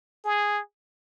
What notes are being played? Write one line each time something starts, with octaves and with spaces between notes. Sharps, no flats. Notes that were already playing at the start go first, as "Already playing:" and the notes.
G#4